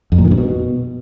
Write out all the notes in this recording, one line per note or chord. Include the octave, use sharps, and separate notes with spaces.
F2
A#2
D#3
G2
B2